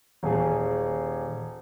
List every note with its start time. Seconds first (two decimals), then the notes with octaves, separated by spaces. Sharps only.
0.23 D#1 G#4